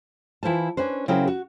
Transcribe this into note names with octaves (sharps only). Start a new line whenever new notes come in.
E3 E4 F4 C5 A5
C#4 D4 B4 C5
C#3 F#3 C4 E4 G#4 A#4
F#4